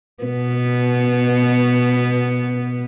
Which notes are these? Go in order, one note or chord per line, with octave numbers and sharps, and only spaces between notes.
B2 B3